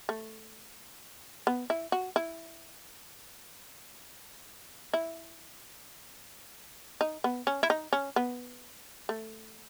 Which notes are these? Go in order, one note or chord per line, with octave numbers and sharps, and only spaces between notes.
A3
B3
E4
F#4
E4
E4
D#4
B3
C#4
E4
D#4
C#4
B3
A3